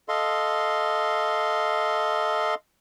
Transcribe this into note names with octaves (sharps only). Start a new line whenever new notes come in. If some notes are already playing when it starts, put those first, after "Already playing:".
A4 D#5 F5 C6